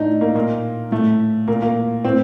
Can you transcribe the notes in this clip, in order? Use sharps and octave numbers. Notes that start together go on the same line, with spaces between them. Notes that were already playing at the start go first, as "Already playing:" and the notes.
Already playing: A2 D4 D#4
A#3
A#2 A#3
A2 A3
A#2 A#3
A#3
A2 C4